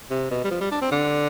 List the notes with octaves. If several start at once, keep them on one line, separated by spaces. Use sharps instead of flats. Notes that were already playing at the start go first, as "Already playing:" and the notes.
C3
B2
G3
F3
G3
D4
C4
D3